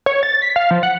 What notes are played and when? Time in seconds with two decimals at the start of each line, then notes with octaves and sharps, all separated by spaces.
0.06 C#5
0.23 A6
0.42 B6
0.56 F5
0.71 F3
0.83 F#5